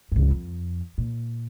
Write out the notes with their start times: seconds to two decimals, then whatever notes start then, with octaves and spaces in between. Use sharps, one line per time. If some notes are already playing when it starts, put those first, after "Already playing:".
0.12 C#2 G2
0.31 F2
0.98 A#2